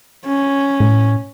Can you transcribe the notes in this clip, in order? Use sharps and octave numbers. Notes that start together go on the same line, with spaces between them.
C#4
A2